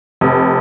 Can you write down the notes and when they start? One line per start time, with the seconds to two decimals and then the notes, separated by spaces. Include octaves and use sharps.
0.21 F1